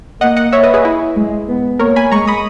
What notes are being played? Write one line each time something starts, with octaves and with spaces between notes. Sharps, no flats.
A#3 D#5 F#5
D#5 F#5
C#5 E5
B4 D#5
G#4 B4
E4
G#3
B3
A#3 A#4 C#5
G#5 B5
G#3 A#5 C#6
B5 D#6